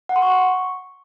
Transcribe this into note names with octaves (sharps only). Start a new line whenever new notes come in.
F#5
C6
C#6